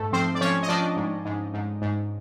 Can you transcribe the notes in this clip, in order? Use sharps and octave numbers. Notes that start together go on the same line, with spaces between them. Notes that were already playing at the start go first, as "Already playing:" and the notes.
Already playing: G#2 A3 A4
F3 C4 C5
D5
F3 C#4 C#5
D#5
F3 D4 D5
G#2
G#2
G#2
G#2